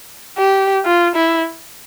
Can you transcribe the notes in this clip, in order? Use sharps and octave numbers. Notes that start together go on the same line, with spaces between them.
G4
F4
E4